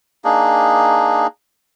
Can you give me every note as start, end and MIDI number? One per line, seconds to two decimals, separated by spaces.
0.25 1.27 58
0.25 1.27 62
0.25 1.27 63
0.25 1.27 68